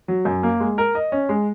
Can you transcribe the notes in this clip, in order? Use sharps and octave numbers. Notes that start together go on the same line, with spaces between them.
F#3
F#2
A#3
G#3
A#4
D#5
C#4
G#3